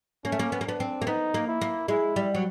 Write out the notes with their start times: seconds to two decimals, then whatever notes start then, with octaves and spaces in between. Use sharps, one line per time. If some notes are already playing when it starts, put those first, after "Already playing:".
0.25 A#3 C#4
0.32 A3
0.39 A#3
0.52 B3
0.61 A#3
0.66 B3 D4
0.80 C4
1.02 A#3
1.07 B3 D#4
1.34 A#3
1.48 E4
1.61 A#3
1.88 G#3 E4
2.16 G3
2.35 F#3